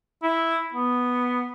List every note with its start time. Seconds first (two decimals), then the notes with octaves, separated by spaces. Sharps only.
0.22 E4
0.74 B3